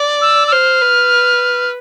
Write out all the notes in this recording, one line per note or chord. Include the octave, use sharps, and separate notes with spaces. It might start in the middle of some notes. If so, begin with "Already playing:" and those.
Already playing: D5
E6
E6
C5 F6
B4